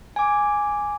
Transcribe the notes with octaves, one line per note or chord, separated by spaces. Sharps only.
G#5 D6